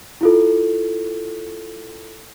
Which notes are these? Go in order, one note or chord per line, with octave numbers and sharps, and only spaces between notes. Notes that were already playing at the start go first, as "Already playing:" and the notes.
E4 F4 A4